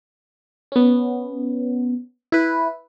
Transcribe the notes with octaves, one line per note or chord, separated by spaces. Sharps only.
B3 C#4
E4 B4